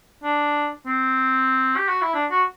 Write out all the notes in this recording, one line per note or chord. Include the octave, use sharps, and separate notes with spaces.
D4
C4
G4
F#4
E4
D4
F#4